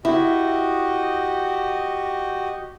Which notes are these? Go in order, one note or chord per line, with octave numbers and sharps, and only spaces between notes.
E4 F#4 G4 D#5